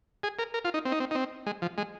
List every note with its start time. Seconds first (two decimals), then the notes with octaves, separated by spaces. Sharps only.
0.23 G#4
0.39 A#4
0.54 A#4
0.65 F4
0.74 D#4
0.85 C4
0.92 D#4
1.00 C4
1.11 D#4
1.15 C4
1.46 G#3
1.62 F3
1.78 G#3